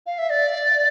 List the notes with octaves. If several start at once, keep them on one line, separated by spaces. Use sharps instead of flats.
F5
E5
D5